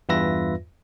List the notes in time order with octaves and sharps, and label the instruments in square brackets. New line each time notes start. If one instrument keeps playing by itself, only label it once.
[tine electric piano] E2 G2 F4 B4 E5 A#6